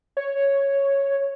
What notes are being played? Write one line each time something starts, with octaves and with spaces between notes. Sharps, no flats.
C#5